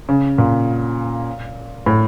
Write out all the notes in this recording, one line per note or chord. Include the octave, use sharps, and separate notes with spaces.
C#3
A#2
A2